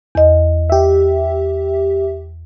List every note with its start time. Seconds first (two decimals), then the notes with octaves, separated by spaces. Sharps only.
0.15 E2 D#5
0.70 G4 E5